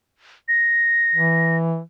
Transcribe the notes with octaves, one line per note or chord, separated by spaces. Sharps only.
A#6
E3